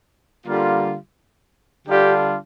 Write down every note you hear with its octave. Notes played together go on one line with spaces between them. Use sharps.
D3 G3 A#3 F4
D3 G3 D4 F4 G4